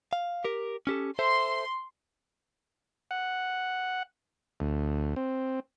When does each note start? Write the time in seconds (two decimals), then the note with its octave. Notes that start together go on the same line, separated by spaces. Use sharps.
0.13 F5
0.44 G4 A#4
0.87 C#4 G4 A4
1.19 A4 C5 E5 C6
3.11 F#5
4.60 D2
5.16 C4